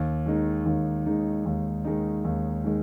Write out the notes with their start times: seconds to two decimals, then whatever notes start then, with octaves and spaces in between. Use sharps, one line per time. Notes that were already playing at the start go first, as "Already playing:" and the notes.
Already playing: D#2
0.26 D#3 G#3 D#4
0.66 D#2
1.06 D#3 G#3 D#4
1.45 D#2
1.85 D#3 G#3 D#4
2.24 D#2
2.64 D#3 G#3